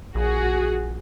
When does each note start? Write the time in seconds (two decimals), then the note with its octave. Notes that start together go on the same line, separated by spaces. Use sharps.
0.15 A#1 F#4 G#4